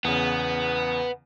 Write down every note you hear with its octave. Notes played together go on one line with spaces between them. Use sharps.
E2 C#3 B3